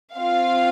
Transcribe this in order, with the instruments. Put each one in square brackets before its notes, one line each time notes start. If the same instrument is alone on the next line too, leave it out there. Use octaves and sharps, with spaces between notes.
[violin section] C4 F4 F5